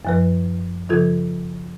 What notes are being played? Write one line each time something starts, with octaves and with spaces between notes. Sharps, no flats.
F#2 F3 B4
C#3 F3 F4 A4 G#6